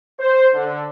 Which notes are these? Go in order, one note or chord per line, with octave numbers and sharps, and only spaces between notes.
C5
D3